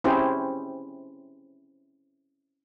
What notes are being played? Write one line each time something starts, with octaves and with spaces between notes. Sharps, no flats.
C4 C#4 E4 G4 G#4 C5